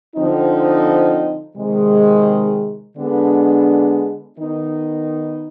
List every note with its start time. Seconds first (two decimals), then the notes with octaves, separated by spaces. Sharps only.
0.16 D3 F3 C4 D#4
1.57 C3 D#3 G#3
2.96 D3 G#3 B3 D4
4.37 D#3 B3 D#4